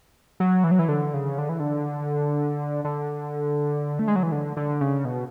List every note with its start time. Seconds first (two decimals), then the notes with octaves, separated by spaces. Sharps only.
0.40 F#3
0.64 E3
0.71 F#3
0.79 E3
0.88 D3
1.14 C#3
1.38 D3
1.49 E3
1.60 D3
2.85 D3
3.99 A3
4.08 G#3
4.16 F#3
4.23 E3
4.32 D3
4.57 D3
4.81 C#3
5.05 B2